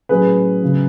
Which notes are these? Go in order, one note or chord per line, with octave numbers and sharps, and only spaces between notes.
A2 F#3 C#4 G#4 B4
C#3 F#3 B3